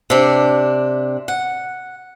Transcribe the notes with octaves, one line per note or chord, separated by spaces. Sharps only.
C3 D4
F#5